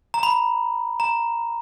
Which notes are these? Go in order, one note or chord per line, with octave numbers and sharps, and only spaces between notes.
A#5
B5
A#5